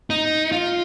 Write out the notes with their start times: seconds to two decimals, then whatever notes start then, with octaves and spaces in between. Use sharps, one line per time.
0.10 D#4
0.52 F4